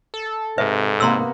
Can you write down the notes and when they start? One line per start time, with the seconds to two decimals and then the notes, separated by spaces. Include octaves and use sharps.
0.14 A4
0.58 G#2 C3 B4 E5
1.00 C3 A#3 B3 A#5 C6 E6